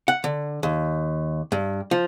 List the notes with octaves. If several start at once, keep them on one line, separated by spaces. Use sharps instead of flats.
F#5
D3
D#2
G2
F3